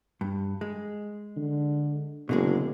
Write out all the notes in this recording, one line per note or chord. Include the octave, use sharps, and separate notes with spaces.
G2
G#3
D3
F#1 B2 D3 G#3